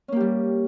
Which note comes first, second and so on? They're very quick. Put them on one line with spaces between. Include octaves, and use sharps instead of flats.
C#4 A#3 G4 G3